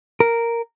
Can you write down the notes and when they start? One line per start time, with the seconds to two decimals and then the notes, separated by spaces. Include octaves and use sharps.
0.20 A#4